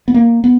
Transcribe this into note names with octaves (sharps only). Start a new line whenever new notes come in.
B3
A#3
B3